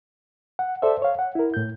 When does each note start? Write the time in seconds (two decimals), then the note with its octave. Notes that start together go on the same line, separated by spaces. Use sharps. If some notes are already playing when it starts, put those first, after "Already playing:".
0.59 F#5
0.82 A4 C5 D5 E5
1.02 C#5 F5
1.19 F#5
1.35 E4 A#4
1.54 A2 G6